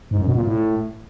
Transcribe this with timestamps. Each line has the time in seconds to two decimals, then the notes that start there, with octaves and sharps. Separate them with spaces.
0.11 G#2
0.19 F#2
0.27 B2
0.35 A#2
0.43 A2